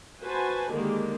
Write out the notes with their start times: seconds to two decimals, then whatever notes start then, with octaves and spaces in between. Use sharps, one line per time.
0.22 F#4 B4 C5 G#5 A5
0.73 D3 D#3 G#3 A#3 G4